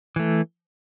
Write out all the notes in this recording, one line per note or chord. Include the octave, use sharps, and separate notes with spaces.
E3 A3